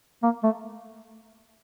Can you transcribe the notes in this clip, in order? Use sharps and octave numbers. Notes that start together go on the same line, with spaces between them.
A#3
A3